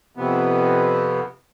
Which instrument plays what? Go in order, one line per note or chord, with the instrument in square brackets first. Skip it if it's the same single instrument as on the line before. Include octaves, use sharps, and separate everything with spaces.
[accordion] F2 C3 B3